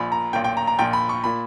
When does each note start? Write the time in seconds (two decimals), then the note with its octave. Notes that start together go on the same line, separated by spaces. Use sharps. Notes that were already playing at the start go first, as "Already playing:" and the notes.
Already playing: A#1 A#2 B5
0.12 A#5
0.33 B1 A#2 G5
0.44 G5
0.57 A#5
0.67 A#5
0.79 A#1 A#2 G5
0.93 B5
1.09 C#6
1.24 A#2 B5